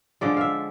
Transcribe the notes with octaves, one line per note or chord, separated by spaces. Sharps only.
D3 F3 G#3 D5
E5 F5